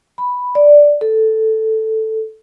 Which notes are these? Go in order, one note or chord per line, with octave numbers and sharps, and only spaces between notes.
B5
D5
A4